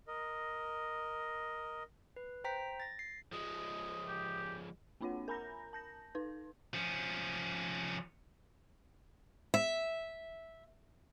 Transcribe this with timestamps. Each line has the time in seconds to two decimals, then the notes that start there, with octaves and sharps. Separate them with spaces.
0.07 A#4 D#5
2.16 B4
2.44 C5 G5 A#5 B6
2.80 A6 A#6
2.99 C7
3.32 F3 G#3 D#6
4.07 G4
5.01 A#3 C4 D4 F4 C#5 F#5
5.28 A#4 G#5 A#5 B5 G6 A#6
5.73 A5 G6 A#6
6.15 D#4 B4
6.74 F3 C#4
9.54 E5